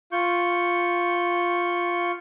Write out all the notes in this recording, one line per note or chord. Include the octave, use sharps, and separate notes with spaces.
F4 C#6 G6